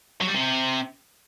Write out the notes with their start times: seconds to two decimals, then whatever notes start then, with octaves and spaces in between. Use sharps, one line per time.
0.21 F#3
0.28 G3
0.35 C3